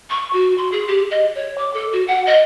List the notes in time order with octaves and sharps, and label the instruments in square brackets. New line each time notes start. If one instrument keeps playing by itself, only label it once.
[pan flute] C#6
F#4
C6
G#4
G4
D#5
C#5
D6
A4
F#4
F#5
D#5